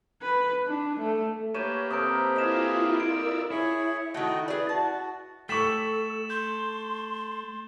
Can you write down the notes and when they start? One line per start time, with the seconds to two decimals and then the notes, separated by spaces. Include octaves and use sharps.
0.23 B4
0.68 D4
1.00 A3
1.54 A#3 G4 B4 C#5 G6 D#7 E7
1.91 C3 A4 A#4 D#6 G6 D7
2.36 E4 F4 D#5 F5 G#5 B6 E7
3.00 A#4 D5 E6 D7
3.51 E4 G#4 C#5
4.14 D#3 A3 F#4 D#5 G5
4.48 G#4 B4 D5
4.69 F#4 A5
5.49 A3 A4 G5 C#6 A6 B6 E7 F#7
6.30 C6 G6